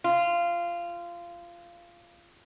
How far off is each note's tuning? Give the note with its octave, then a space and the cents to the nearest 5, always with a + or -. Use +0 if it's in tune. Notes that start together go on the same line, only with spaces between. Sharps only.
F4 -15